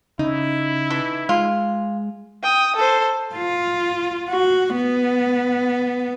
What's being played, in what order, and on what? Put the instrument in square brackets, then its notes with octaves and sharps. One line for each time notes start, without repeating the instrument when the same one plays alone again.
[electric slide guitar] C#3 [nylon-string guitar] D#4 [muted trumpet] E4
[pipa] E3 A4
[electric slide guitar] G#3 [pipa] F4
[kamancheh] G5 D#6
A4 C5
[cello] F4
F#4
B3